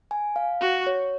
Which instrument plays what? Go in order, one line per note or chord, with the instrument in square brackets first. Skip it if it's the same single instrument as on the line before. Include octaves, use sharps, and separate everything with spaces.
[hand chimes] G#5
F5
[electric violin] F#4
[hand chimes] C#5